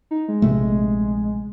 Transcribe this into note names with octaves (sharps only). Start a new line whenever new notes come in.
D#4
G#3
A#1 C3 A3